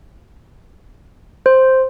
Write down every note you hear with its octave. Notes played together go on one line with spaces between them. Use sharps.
C5